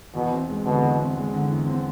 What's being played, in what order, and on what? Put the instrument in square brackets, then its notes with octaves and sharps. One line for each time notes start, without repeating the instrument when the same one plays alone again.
[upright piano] E2 [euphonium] B2
[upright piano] C4
G#3
[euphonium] B2 [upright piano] D3
[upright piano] E2
C4
G#3
D3
E2
C4